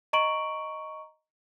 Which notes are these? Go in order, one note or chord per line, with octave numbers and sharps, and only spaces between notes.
D#5 A#5 C#6 D7 F#7